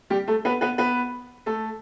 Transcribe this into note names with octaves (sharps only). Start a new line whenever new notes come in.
G3 G4
A3 A4
B3 B4
B3 B4
B3 B4
A3 A4